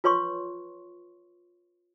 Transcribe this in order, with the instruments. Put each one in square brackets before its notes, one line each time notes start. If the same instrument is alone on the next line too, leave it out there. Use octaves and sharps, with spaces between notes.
[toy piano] F4 B4 C#5 C6 C#6